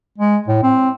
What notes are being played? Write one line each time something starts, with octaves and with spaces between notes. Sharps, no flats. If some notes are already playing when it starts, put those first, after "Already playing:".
G#3
A2
C4